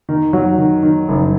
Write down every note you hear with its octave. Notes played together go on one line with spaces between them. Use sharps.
D#3
F#3
D#3
D#3
F#1